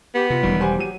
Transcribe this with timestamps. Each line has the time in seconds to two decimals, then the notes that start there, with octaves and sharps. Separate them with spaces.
0.15 B3 G4
0.30 C3 F4
0.43 E1 D#3 F#3 G3
0.60 G4 C5 F#5 G#5
0.79 F#3 D#7